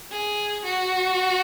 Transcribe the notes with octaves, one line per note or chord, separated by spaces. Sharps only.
G#4
F#4